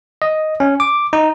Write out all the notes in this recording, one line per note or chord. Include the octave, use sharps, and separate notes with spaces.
D#5
C#4
D6
D#4